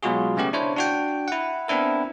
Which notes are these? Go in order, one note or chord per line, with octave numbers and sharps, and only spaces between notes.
B2 F#3 G#3 F4 F#4 G#4
C#3 A3 B3 G4
D4 E4 C5 C#5
D4 F#4 G5
E4 F#5
B3 C4 D4 E4 A#4